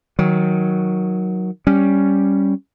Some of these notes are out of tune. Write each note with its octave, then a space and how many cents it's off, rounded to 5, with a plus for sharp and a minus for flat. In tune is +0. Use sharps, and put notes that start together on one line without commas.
D#3 +15 F#3 +0
G3 +0 C#4 +0